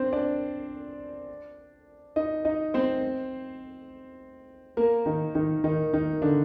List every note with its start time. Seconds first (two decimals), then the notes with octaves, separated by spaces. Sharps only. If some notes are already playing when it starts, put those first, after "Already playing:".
Already playing: C4 D4 C5
0.13 D4 D5
2.16 D#4 D#5
2.45 D#4 D#5
2.74 C4 C5
4.77 A#3 A#4
5.06 D#3 D#4
5.35 D#3 D#4
5.64 D#3 D#4
5.93 D#3 D#4
6.22 D3 D4